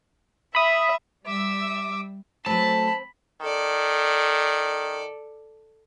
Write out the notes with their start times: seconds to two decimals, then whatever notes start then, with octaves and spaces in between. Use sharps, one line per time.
0.55 E5 B5 D#6
1.26 G3 E5 D6 E6
2.46 F#3 A3 C4 B4 A5 B5
3.42 D#3 A4 D5